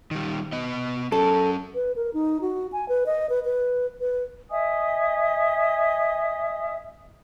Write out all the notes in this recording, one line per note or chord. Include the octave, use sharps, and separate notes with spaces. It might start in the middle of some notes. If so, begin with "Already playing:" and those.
D#3 G3
B3 D#5
F#3 C#4 A4
B4
A#4
D#4
F#4
G#5
B4
D#5
B4
B4
B4
D#5 E5 G#5 D#6